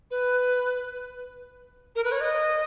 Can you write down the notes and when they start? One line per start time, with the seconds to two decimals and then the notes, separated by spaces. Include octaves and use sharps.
0.11 B4
1.96 A#4
2.04 B4
2.12 C#5
2.21 D#5